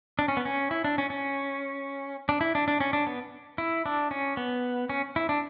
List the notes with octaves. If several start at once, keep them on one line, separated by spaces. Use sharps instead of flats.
D4
C#4
B3
C#4
E4
D4
C#4
C#4
D4
E4
D4
D4
C#4
D4
B3
E4
D4
C#4
B3
C#4
E4
D4